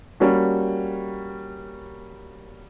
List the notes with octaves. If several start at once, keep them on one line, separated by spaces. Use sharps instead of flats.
G3 A#3 C#4 F#4